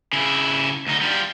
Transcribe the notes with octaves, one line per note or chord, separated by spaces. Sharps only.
C#3 E4
D2 D#4
G3 F4